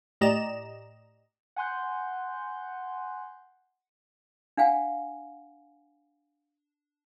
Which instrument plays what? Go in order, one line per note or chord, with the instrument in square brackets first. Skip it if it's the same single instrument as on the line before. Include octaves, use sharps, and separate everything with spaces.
[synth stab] A2 G4 D5 D#5 A#5 E7
[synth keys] F#5 G#5 C6 F#6 G6
[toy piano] D4 F5 F#5 G#5